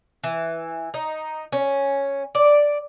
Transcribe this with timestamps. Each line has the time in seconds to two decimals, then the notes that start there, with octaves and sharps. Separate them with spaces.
0.24 E3
0.94 D#4
1.52 C#4
2.35 D5